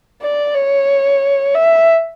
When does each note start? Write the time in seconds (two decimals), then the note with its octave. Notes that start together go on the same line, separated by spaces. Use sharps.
0.22 D5
0.55 C#5
1.55 E5